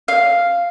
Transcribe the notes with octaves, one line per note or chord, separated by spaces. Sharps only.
F5